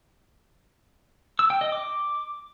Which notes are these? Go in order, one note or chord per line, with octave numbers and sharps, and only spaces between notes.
E6
G5
D#5
D6